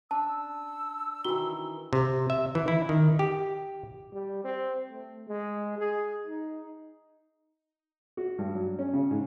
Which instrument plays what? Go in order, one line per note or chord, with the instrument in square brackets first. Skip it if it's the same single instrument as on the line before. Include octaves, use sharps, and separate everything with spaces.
[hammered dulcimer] D4 [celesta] A5 [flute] E6
[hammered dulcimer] D#3 E3 [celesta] F#4 G7
[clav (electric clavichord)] C3
E5
E3
E4
D#3
G4
[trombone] G3
C4
A3
G#3
G#4
D#4
[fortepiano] F#4
G2
F#3
C#4
C#3
G#2